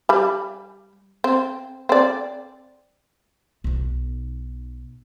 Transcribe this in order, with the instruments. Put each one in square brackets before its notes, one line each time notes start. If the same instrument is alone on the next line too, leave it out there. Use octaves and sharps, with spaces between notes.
[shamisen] G3 B5
C4
C4 D5
[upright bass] B1 D#4